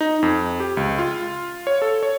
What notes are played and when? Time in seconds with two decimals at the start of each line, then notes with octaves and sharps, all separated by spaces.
0.01 D#4
0.23 F2
0.60 G4
0.77 C#2
0.99 F4
1.67 C#5
1.82 A4
2.03 C#5